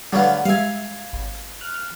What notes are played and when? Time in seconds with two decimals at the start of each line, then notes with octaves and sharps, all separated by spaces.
0.13 D3 F#3 G3 A3 B3 F5
0.45 G3 G#3 E5 F5 G#5
1.13 G#1
1.61 F6 F#6